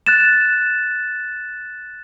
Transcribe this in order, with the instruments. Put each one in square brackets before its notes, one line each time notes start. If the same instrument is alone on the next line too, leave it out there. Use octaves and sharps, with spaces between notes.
[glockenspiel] F#6 A6 E7